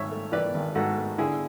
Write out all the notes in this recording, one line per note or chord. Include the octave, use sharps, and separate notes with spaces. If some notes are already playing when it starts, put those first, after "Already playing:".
Already playing: G#1 G#2 C#5 E5
A3
E3 B4 D5
G#1
G#2 F#4 A4
A3
D3 E4 G#4